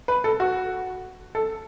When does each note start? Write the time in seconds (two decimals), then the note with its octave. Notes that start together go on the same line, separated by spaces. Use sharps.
0.08 B4
0.24 A4
0.40 F#4
1.35 A4